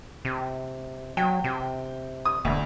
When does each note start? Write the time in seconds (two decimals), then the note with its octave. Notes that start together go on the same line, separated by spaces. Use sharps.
0.25 C3
1.17 F#3 G5
1.44 C3
2.25 D#6
2.45 E1 D2